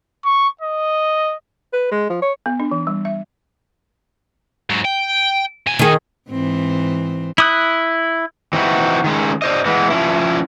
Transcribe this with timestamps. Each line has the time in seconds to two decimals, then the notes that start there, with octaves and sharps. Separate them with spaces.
0.25 C#6
0.61 D#5
1.73 B4
1.92 G#3
2.10 F3
2.22 C#5
2.46 B3
2.60 D4
2.71 E3
2.87 G3
3.05 E5
4.70 G#2 F#3
4.85 G5
5.67 B2 G#5
5.79 D#3 G#4
6.29 G#2 E3 C4
7.38 E4 D#6 F#6
8.53 E3 C4 D#4 E4 F#4
9.04 D#3 G#3 C#4
9.42 D4 C5 D#5
9.65 E3 G#3 B3
9.90 F3 C#4 E4